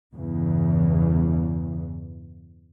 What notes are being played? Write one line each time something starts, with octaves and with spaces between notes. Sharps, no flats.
E2 G2 C#3 E3